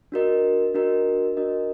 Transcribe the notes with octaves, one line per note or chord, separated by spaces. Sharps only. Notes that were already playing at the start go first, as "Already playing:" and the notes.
D4 F#4 A#4 D#5
D4 F#4 A#4 D#5
D4 F#4 A#4 D#5